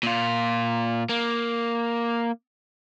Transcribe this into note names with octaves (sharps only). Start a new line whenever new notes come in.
A#2 F4
A#3